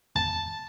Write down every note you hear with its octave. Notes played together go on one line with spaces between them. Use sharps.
A5